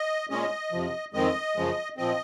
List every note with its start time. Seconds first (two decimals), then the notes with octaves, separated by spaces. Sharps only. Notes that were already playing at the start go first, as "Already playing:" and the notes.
Already playing: D#5
0.30 A#2 G#3 C#4 D#5
0.72 F2 C3 F3
1.13 F2 D#3 G#3 C4 D#5
1.56 F#2 C#3 F3 G#3
1.97 A#2 F3 C4 D#5